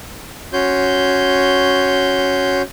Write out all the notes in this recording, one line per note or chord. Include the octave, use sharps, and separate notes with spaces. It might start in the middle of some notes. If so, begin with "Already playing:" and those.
C#4 F#4 C#5 C6 G6